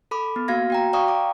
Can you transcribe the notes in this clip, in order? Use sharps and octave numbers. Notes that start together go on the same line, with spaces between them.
A4 B5 D6
B3
A#3 F#4 F5 G#6 A#6
F#4 G5 A#5
D5 F5 G5 A#5 C#6 D#6
D6